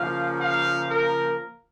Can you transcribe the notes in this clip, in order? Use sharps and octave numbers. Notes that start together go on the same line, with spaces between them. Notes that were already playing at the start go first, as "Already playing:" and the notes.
Already playing: C#3 F3 A#3 F5
F5
A#4